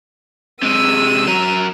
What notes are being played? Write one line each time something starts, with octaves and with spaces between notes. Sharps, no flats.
C3 G#3 E6 D#7
F#3 A#4